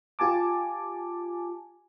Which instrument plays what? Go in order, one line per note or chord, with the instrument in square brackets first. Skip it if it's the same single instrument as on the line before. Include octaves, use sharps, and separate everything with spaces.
[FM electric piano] F4 G4 G#5 A5 D6